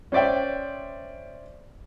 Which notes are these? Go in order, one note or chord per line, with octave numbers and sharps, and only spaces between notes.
C#4 C5 D5 E5 G5